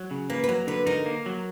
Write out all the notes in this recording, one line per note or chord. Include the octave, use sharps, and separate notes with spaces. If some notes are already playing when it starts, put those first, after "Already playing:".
Already playing: F#3
C#3
A#3 B4
B4
F#3 A#4
D3 B4
D#4 A#4
A#3
F#3